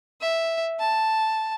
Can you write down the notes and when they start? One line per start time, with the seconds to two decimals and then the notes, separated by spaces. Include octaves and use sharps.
0.21 E5
0.80 A5